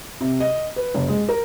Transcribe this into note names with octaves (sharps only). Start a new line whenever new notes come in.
C3
D#5
B4
F#1
G#3
A#4